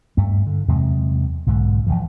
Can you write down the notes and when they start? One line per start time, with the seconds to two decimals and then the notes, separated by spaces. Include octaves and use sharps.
0.17 G2 A3
0.46 D3
0.68 E2 C3 F#3 G#3
1.46 B1 G#2 D3
1.87 A#1 C#3 E3 F3